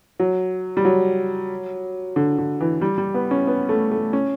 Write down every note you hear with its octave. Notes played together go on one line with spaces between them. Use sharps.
F#3
G3
F#3
D3
D3
E3
G3
G3
B3
C#4
B3
A3
A3
C#4